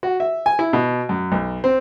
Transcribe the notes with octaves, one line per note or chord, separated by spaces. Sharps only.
F#4
E5
G#5
E4
B2
F#2
B1
C4